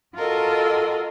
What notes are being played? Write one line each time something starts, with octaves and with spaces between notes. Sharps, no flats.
F4 F#4 A4 A#4 D#5